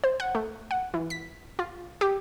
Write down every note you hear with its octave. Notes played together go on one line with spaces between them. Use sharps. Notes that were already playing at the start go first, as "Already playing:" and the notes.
C5
F#5
A3
F#5
E3
B6
F4
G4